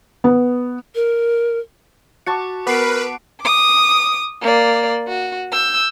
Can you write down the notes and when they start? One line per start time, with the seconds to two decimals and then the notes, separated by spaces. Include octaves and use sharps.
0.24 B3
0.95 A#4
2.27 F#4 A5 C#6 D6 C#7
2.67 B3 A#4 B4 D6 C7 D7
3.41 D6 D#6
4.41 A#3 D5
5.08 F#4
5.52 E6 G6